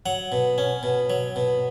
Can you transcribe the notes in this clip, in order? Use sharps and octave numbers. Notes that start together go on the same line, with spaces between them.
F#3 F#5
B2
C#4
B2
F#3
B2